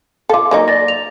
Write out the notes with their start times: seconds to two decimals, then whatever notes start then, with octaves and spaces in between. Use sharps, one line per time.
0.29 F4 A4 F5 D6
0.51 F#3 A#3 D#4 A#4
0.68 D5 A6 A#6
0.88 F7